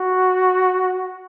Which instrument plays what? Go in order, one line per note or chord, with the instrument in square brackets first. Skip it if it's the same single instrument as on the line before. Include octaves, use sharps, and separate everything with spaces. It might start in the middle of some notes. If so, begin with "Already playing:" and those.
Already playing: [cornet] F#4